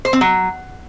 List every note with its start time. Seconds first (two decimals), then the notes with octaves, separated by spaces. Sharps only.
0.05 C5
0.13 C4
0.21 F#3